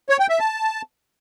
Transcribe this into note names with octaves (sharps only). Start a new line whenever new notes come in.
C#5
G5
E5
A5